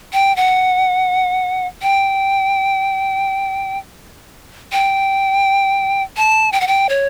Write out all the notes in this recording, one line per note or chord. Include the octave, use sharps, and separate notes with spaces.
G5
F#5
G5
G5
A5
G5
F#5
G5
C#5